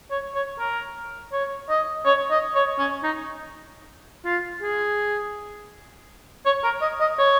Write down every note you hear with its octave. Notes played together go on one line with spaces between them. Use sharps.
C#5
C#5
A#4
C#5
D#5
C#5
D#5
C#5
C#4
D#4
F4
G#4
C#5
A#4
D#5
D#5
C#5